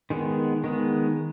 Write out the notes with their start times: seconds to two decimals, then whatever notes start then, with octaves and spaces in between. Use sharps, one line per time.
0.10 D#3 G#3 B3
0.64 D#3 G#3 B3